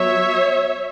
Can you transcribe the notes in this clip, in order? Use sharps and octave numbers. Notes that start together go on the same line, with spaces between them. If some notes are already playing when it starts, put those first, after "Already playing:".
Already playing: F#3 B3 C#5 E5